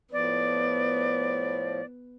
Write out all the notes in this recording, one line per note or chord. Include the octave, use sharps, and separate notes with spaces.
A2 F3 B3 D5